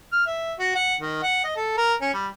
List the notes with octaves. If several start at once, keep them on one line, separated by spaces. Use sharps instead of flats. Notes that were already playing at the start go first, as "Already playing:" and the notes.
F6
E5
F#4
F#5
D#3
F#5
D#5
A4
A#4
C#4
G3